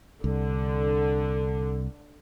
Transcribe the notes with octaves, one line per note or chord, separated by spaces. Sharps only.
C2 D3